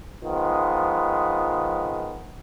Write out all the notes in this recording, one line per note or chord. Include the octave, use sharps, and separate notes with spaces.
D#3 F3 G#3 B3